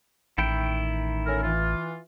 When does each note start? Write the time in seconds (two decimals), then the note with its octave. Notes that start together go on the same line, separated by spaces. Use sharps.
0.38 A1 D#3 E4 G5
1.27 C#4 A4 A#4
1.44 E3 F4